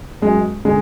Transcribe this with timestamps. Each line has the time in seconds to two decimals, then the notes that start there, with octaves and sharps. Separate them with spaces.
0.22 F#2 G#3
0.65 D3 G#3